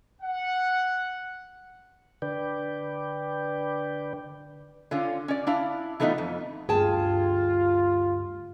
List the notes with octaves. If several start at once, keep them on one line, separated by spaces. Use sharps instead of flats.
F#5
D3 B4 D5 G5
D3 C#4 F4
C#4 D5
D4 E4 F5
E3 A3 B3 D#4 F4
F2
D2 G2 F4 G#4 G5 A5